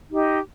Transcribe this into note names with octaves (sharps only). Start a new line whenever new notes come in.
D#4 G4 D#5